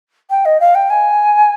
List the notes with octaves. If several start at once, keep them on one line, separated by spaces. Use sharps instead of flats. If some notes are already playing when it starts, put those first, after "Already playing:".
G5
D#5
F5
G5
G#5